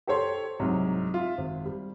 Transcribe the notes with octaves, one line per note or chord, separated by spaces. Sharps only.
G4 A4 C5 C#5 C6
C2 G#2 C3 F#3
F4 E5
G#1
G3